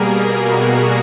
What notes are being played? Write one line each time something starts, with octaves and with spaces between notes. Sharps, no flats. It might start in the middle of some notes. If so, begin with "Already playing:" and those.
Already playing: B2 G3 A#3 G#4 A#4
F#4 G#4